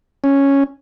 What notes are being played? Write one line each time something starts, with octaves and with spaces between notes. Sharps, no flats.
C#4